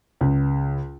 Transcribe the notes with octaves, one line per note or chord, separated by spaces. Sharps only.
C#2